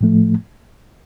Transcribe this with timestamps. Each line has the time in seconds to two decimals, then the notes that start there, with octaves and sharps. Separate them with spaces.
0.01 A2 F3 A3